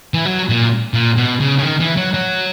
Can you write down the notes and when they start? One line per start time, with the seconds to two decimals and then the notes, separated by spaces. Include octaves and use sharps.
0.14 E3
0.25 F#3
0.49 A#2
0.94 A#2
1.17 B2
1.40 C#3
1.58 C#3
1.62 D#3
1.80 E3
1.96 F#3
2.14 F#3